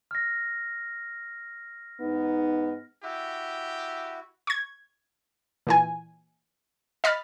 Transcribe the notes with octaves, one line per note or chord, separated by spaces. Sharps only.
F6 A#6
G#2 B3 D#4
E4 F#4 G4
C#6 G#6
A#2 E3 G#5
D#5 B5 F6 A6